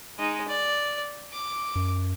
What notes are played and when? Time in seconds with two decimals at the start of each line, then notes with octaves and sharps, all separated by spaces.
0.19 G#3 D#4
0.48 D5
1.33 D6
1.76 F#2